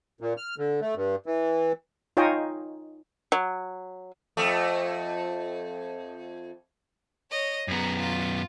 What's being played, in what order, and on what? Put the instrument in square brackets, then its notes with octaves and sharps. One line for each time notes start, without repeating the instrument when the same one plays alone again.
[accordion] A#2
F6
D3
A3
G2
E3
[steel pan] D#4 F4 C#5 D#5 G5 G#5
[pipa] F#3
[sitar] F2 A3
[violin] C#5 D#5
[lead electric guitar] F#2 B3 [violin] G#4 A#5
[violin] F4